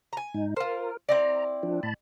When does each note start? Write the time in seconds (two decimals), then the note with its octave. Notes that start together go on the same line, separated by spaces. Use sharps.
0.13 G#5 A#5
0.34 G#2 D#4
0.56 F4 A#4 C5
1.09 C4 E4 D5 A#5
1.63 F3 D4
1.83 A2 A5 B5